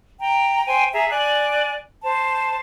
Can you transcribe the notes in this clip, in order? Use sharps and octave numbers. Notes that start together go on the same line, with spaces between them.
G5 A#5
C5 G5 G#5
G#4 E5 A#5
D5 G#5 F#6
C5 A5